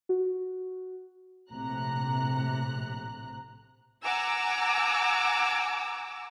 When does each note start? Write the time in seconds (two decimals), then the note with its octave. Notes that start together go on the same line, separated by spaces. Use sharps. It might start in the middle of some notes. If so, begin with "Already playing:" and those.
0.09 F#4
1.51 A#1 A2 C3 A#5 F#6
4.04 F#5 G#5 A#5 D6 E6